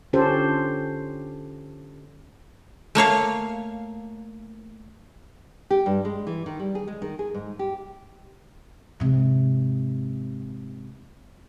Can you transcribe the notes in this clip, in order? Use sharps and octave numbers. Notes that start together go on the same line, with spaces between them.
D3 C#4 F4 G4 A4 C5
A3 A#3 C#5 F5
G4
G2
G#3
E3
D#3
G3
G#4
G#3
D#3
G#4
G#2
G4
G#2 C3